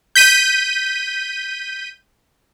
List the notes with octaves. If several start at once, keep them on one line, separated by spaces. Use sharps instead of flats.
G6 B6 D#7